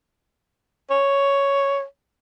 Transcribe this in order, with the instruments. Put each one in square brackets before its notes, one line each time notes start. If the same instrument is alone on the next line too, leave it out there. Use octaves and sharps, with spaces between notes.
[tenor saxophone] C#5